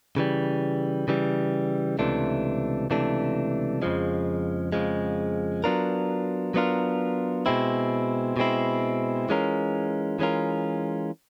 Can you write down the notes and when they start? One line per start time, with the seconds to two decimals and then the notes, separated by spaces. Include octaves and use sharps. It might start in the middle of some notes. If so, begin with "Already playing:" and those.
0.17 C#3 E3 G3
1.08 C#3 E3 G3
1.99 C#2 C3 E3 A3 D4
2.90 C#2 C3 E3 A3 D4
3.82 F2 C#3 F3 G#3
4.72 F2 C#3 F3 G#3
5.64 F#3 B3 D4 F4 A#4
6.54 F#3 B3 D4 F4 A#4
7.46 B2 G#3 C4 E4
8.37 B2 G#3 C4 E4
9.29 E3 G#3 C#4 F4 A#4
10.19 E3 G#3 C#4 F4 A#4